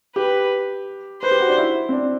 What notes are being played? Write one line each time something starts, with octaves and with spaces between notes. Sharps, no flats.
G4 B4
B4 C5
G4
F#4
D4
E4
C4
D4